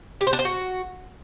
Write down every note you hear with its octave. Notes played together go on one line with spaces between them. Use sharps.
G4
C5
D4
C5
F#4